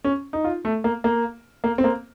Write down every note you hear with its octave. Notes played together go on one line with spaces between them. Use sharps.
C#4
D#4
F4
A3
A#3
A#3
A#3
C4
A#3